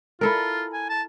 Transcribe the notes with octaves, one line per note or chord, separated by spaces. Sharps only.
E4 F4 A4 A#4
G#5
A5